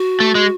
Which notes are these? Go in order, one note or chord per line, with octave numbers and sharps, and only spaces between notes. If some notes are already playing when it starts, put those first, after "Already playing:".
Already playing: F#4
A3
G#3